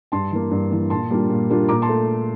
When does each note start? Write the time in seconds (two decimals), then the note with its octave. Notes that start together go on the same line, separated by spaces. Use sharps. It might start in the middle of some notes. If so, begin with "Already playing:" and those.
0.12 G2 A5 C6
0.32 E3 A#3
0.51 G2
0.71 E3 A#3
0.90 A#2 A5 C6
1.10 G3 A#3 D4 F4
1.30 A#2
1.50 G3 A#3 D4 F4
1.69 A#2 A#5 D6
1.82 A5 C6
1.89 A3